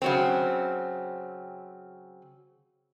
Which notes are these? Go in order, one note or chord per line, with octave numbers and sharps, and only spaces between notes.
C#3 F#3 C4